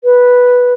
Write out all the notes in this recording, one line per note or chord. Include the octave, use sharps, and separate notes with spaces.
B4